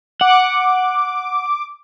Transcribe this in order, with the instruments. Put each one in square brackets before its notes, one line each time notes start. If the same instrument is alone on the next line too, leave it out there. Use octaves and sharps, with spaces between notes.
[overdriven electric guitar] F#5 [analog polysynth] D6